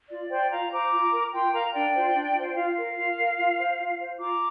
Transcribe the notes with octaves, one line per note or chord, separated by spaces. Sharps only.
F4 D5
C5 D5 G5
F4 F5 A#5
C5 A#5 D6
F4
A#4
F4 G5 C6
A#4 F5 A#5
D4 D5 G5
F4 C5
D4
F4 C5
G5
F4 F5
A#4
F4
A#4
F4
C5
F4
C5
F4 A#5 D6